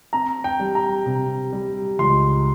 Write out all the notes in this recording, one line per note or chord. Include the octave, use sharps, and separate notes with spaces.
C4 A#5
G5
G3
A#5
C3
G3
C#2 C6